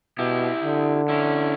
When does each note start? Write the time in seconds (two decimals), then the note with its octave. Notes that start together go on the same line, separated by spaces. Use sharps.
0.18 B2 E4 G4
0.64 D3
1.09 C#4 E4